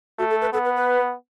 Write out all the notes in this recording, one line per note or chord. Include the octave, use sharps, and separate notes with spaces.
A3 F#4
A4
B4
B3 A4
B4
B4